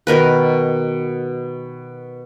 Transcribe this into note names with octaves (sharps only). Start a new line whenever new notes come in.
B2 D#3 A#4 B4